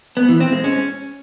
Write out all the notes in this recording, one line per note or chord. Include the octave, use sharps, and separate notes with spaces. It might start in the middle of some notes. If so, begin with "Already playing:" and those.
B3
E3
C4
G#3
C#4